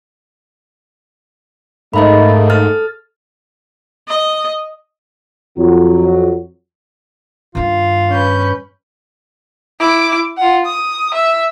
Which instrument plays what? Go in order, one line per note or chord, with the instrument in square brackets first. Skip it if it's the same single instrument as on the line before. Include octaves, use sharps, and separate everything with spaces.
[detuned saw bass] G#2 [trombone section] A3 A#3 D#4 [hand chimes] D#5 E5 B5
[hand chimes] A4 F6 A6
[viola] D#5
[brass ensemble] F2 F#3
[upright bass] G2 D#3 [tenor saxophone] F4
[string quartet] C#4 B4 G6
[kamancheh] E4 D6
F4 F#5
D#6
E5